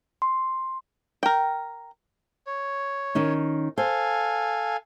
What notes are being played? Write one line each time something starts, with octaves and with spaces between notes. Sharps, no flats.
C6
A#4 G5
C#5
D#3 C#4 D#4
A4 C5 F5 G#5